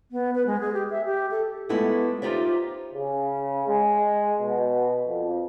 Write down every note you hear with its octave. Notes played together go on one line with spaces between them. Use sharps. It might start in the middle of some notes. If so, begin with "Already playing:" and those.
B3
B4
G#3
G#4
G4
E5
G4
A4
G#3 A3 B3 E4 G4
D#4 F4 G4 C5 D5 E5
C#3
G#3
B2
F2